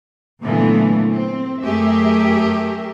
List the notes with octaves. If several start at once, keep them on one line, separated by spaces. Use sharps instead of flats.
A#2 D3 E3 F#3 A3 B3
C4
F#2 A3 G4 G#4 A#4 E5